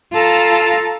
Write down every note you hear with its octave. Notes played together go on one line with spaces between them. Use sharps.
F4 A4 A5 A#5